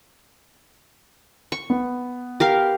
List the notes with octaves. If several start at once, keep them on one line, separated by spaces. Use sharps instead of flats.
C#6
B3
G4 A#4 F5